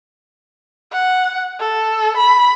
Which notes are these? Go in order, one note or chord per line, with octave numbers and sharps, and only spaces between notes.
F#5
A4
B5